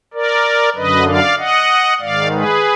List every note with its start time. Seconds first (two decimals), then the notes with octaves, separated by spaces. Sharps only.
0.14 A#4 D5
0.76 F#2 D3 B4 D#5
1.07 D5 F5
1.38 D#5 F#5
2.00 G#2 D#3 D5 F5
2.32 G#4 B4